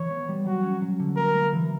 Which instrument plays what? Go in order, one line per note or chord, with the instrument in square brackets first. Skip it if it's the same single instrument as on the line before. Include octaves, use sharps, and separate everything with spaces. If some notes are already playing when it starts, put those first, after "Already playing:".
Already playing: [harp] E3 [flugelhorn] C#5
[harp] B3
G3
[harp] F#3 [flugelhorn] F#4
[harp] C#4
F#3
D3
[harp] A#3 [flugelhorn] A#4
[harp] A#3
E3